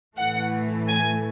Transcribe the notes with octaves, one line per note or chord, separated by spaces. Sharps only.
A2 E3 A3 F#5
G#5